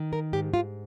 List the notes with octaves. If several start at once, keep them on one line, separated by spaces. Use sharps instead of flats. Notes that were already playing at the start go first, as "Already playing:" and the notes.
Already playing: D#3
A#4
G#2 G4
F4